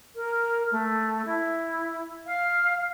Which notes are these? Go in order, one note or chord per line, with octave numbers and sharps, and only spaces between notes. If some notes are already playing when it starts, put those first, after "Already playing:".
A#4
A3
E4
F5